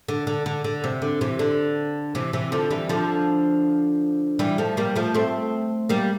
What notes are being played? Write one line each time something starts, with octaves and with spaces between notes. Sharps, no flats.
D3
D3
D3
D3
C3
D3
C3 E3
D3
C3 E3
C3 E3
D3 F3
E3 G3
D3 F3
E3 G3
F3 A3
G3 A#3
F3 A3
A3 C4
G3 A#3